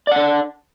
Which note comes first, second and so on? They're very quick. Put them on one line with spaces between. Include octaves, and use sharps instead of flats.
D5 F#5 D4